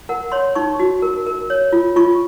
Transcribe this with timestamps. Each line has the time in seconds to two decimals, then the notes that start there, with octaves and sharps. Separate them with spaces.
0.09 A#4 F#5
0.32 C#5 C6
0.55 D#4 C#6
0.80 F#4
1.02 A#4
1.27 A#4
1.50 C#5
1.73 F4
1.96 F4 C#6